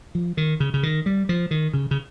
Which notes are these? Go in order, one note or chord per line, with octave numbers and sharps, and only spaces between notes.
F3
D#3
C#3
C#3
D#3
G3
F3
D#3
C#3
C#3